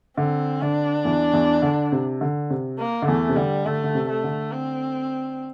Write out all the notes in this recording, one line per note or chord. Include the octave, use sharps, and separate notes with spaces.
D3 C4
D3 D4
E2 E3
E2 E3
D3
C3
D3
C3
A#3
D3
E2 E3 A3
C3
D3 G3
D3 A3
D3
C3
A3
D3
C4